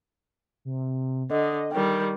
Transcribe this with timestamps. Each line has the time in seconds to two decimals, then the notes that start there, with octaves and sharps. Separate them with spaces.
0.65 C3
1.30 D3 D#5
1.72 D#3 G3 G5